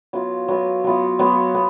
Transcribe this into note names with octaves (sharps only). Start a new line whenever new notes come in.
F#3 B3 F4
F#3 B3 F4
F#3 B3 F4
F#3 B3 F4
B3